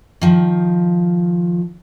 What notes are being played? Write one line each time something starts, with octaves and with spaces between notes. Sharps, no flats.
D#3 F3